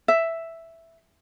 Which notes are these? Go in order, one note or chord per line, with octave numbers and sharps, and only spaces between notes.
E5